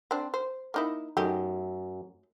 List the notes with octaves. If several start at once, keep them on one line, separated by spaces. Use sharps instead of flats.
C4 D4
C5
A#3 D#4 E4
F#2 A3 D#4 G4